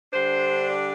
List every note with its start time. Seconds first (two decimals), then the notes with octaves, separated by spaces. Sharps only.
0.13 D3 G3 D4 C5
0.70 D5